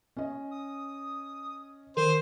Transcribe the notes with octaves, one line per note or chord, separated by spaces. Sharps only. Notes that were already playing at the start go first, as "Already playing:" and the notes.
C#4 D#5
D#6
D#3 A#4 C5